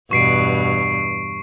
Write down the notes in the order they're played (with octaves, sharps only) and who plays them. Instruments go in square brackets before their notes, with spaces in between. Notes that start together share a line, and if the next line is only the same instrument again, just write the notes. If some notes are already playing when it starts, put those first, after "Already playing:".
[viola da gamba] E2 G2 B2 [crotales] C#6 C7 D7